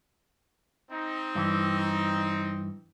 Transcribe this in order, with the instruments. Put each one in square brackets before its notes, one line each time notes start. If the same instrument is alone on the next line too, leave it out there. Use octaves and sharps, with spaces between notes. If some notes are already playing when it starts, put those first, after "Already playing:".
[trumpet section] C4 D#4
[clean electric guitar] G2 E3